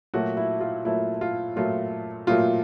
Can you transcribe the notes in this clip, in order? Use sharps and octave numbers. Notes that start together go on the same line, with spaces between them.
A#2 F#3 A3 F#4
E4
F4
A#2 F#3 A3 E4
F4
A#2 F#3 A3 F4
A#2 F#3 A3 F4